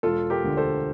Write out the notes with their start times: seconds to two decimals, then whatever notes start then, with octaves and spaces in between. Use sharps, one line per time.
0.03 E1 F4 A4
0.30 G4 A#4
0.44 D2 D3
0.57 A4 C5